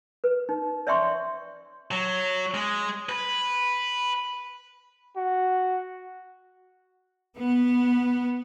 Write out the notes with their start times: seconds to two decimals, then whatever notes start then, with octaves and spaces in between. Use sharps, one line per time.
0.24 B4
0.49 D#4
0.87 C#5 D5 E5 G5 C6 C#6
1.91 F#3
2.54 G#3
3.09 B4
5.17 F#4
7.38 B3